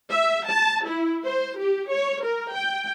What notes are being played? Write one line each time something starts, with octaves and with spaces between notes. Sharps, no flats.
E5
A5
E4
C5
G4
C#5
A#4
G5